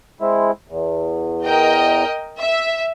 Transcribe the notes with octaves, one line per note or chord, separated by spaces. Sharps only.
G#3 C4 E4
E2
A#4 D#5 G5
E5